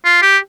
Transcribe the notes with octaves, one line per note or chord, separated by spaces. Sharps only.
F4
G4